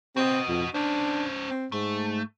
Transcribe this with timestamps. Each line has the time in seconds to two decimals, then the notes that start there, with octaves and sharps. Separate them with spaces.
0.17 C4 F#4 D#5
0.48 F2
0.74 C#4 D4 C5
1.50 C4
1.72 G#2 A3